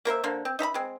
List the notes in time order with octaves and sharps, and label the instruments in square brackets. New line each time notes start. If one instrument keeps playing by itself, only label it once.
[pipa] A#3 A#4 C5 E5
D3 A#3 C5
C4
D#4 E5 A#5 B5
G#3 C4